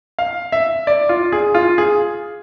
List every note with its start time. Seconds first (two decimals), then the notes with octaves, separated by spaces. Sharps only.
0.19 F5
0.52 E5
0.87 D5
1.09 F4
1.32 G#4
1.55 F4
1.78 G#4